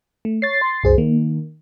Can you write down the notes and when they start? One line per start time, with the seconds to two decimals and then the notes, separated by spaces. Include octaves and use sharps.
0.25 A3
0.42 C#5 A6 C7
0.61 C6
0.84 C2 F#2 G#4 C5
0.98 D#3 A#3